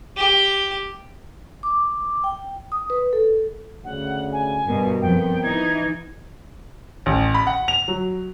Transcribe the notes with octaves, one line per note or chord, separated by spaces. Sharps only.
G4
D6
G5
D#6
B4
A4
D2 C#3 F#5
G#5
G2 B2 A#4
F2 B3 G5
E3 D#4 G#6
A1
B5
F#5
F7
F#3